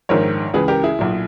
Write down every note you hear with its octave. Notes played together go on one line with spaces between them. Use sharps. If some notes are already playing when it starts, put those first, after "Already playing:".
A#1 G#2 D#3 A#4 C#5
C#2 C#3 E3 G#4 B4
G4 A#4
E4 G#4
B1 A#2